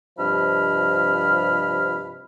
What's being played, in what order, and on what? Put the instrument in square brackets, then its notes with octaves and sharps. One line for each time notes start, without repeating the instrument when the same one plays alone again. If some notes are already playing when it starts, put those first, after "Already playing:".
[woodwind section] G2 C3 F3 D#5 B5 F6